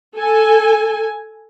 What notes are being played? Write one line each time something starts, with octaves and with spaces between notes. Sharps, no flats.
A4 G#5